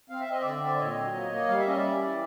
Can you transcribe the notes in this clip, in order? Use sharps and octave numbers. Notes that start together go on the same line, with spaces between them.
C4 F5
E5
C4 D#5
D3 D5 E5
C4
D5
A#2 C#5 D#5
F#3
A#3
A#3
G3 F5
E5
C#4 D#5
D5 E5
G3
E3